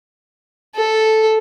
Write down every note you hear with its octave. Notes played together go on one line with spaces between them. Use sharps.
A4